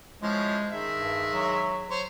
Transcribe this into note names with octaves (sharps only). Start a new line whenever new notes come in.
F3 G#3 C#4 E4
D#3 G#3 E5
G2
F#3
C5 C#5